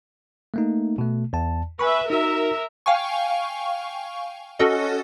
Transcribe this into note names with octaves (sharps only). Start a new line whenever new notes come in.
A3 A#3 D#4
B2 A3
E2 A5
B4 E5 G#5 B5 C#6
D#4 F#4 A#4 E5
F5 G5 G#5 C#6
C#4 F#4 A4 D#5